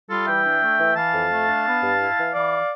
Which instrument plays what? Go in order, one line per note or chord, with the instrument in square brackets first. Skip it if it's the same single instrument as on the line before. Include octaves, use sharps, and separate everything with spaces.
[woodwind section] G3 F4 A4
E3 E5 G5
D4
A3
E3
E3 F5 A5
F2
A3
D4
B3
G2
E4
E3
E3 D5 F5